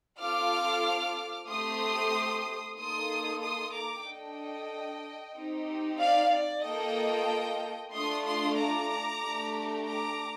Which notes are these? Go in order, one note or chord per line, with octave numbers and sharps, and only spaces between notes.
C4 F4 A4 D6 F6
A3 C4 G4 C6 D#6
A#3 D#4 A4 C6 D#6
C6 D#6
A#5 D6
D4 A4 D#5 G5
C4 D#4 G4
D5 F5
D5
A#3 F4 A4 D#5 G5
A3 D4 F4 C6 D#6
C6 D#6
A#5 D6
A3 D4 G4
A#5 D6